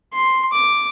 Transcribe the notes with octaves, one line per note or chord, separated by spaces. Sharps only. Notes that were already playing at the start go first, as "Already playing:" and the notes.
C6
D6